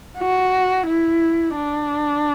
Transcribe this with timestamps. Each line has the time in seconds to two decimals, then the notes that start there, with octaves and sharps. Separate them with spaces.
0.18 F#4
0.87 E4
1.56 D4